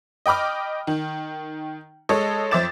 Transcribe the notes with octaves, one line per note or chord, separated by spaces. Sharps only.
D#5 G5 B5 D6 F6
D#3
G#3 A4 C#5 D#5
F2 C5 E5 D6 A6 E7